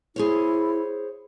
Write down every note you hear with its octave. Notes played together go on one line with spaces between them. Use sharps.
E4 G#4 C5 C#5